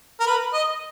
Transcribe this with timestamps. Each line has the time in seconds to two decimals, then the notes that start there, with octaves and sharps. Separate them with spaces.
0.20 A#4
0.27 B4
0.53 D#5